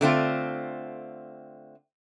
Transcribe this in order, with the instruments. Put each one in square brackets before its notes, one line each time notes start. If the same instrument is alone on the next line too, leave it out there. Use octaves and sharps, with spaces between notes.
[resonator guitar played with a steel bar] D3 A3 C4 F4